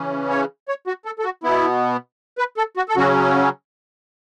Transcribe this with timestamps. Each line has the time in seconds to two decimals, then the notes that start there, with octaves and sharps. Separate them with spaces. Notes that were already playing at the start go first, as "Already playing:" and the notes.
Already playing: C#3 E3 C#4
0.30 C#5
0.68 C#5
0.87 F#4
1.05 A4
1.19 A4
1.24 F#4
1.43 B2 B3 E4
2.38 B4
2.57 A4
2.77 F#4
2.89 A4
2.96 C#3 F#3 C#4 F#4